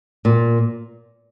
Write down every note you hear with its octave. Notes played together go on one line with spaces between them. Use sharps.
A#2